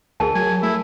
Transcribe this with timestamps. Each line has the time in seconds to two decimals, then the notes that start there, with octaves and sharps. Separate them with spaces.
0.20 D2 G#4 A#4 A5
0.35 F#3 G#5
0.63 A3 E4